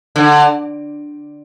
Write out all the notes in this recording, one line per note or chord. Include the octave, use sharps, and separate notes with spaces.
D3